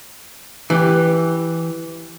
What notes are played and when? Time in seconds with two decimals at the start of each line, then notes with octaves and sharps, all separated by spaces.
0.70 E3 G4